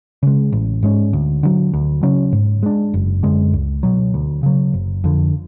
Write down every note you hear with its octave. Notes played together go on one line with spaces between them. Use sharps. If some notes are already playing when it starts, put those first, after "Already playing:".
C#3 G#3
A1
G#2 G#3 C#4
D2
D3 F#3
D2
C#3 F#3 C#4
G#2
G#3 D4
F#1
F#2 D3 G#3
C#2
B2 F#3
D2
C#3 F#3
F#1
F2 D3